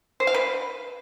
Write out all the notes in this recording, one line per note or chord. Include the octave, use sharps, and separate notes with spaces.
C5
F5
B4